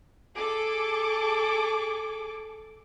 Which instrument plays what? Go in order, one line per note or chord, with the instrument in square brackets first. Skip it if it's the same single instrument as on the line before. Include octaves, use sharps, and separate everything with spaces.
[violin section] G#4 A4 D6